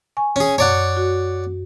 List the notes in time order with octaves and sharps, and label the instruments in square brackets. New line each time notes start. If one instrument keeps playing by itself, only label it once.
[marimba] G#5 C#6
[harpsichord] C#4 G#4
[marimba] F#2 [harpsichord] C#5 D5 F#5
[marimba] F#4